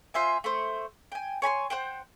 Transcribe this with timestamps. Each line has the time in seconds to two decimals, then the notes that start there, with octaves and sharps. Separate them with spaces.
0.14 F4 C5 E5 G#5
0.44 A3 C5
1.12 G5 G#5
1.42 C#5 G#5 B5 C6
1.70 C5 F#5 G5